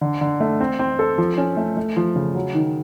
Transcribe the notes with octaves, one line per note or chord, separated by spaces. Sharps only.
D3
D3
A3
C4
C4
A4
F3
C#4
A3
A3
F3
C#3
F#3
D#3